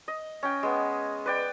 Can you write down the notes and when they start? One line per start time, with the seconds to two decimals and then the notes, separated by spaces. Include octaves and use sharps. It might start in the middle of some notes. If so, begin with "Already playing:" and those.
0.08 D#5
0.43 C#4 G5
0.63 G#3 B3
1.26 B4 D5 G5